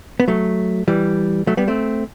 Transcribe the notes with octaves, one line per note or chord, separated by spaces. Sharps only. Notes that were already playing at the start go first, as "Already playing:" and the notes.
B3
F#3 A3
E3 G3
F#3 A3
G3 B3
A3 C4